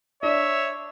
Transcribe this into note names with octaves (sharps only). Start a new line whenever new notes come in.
D4 C#5 E5